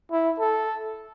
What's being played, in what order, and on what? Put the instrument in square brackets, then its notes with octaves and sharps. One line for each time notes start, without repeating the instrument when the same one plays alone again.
[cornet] E4
A4